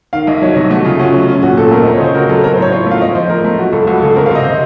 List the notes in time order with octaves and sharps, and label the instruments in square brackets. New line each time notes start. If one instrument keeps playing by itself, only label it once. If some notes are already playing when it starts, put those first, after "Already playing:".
[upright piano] D#3 [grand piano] F5
[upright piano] C2 [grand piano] D#5
[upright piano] F#3 [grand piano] C#5
[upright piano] C3 [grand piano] D#5
[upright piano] A3 [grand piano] F#4
[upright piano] C#3 [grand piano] F4
[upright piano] C#4 [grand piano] F#4
[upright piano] F#3
[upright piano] C#4 [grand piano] F4
[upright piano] A#2 [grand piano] F#4
[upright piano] A#2 [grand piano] A4
[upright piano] A3 [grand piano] A#4
[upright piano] C4 [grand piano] D#5
[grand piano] C#5
[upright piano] C#3 [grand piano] C5
[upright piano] F#4 [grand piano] A#4
[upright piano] F#3 [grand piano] A4
[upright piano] C4 [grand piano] A#4
[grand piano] C5
[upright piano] A2 [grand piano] C#5
[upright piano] F4 [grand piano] C#5
[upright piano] A3
[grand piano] F5
[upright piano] C4 [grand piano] D#5
[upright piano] F3 [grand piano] C5
[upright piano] F3 [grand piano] A#4
[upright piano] A3
[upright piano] F#3 [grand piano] F#4
[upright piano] C#2 [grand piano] A4
[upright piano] C#2 [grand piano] F#4
[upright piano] C#3 [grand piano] A4
[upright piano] C4 [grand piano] A#4
[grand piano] F5
[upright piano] C3 [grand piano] D#5
[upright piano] C3 [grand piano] C5